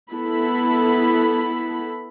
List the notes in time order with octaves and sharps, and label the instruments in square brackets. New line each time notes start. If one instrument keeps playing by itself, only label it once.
[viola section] B3 E4 A4 B5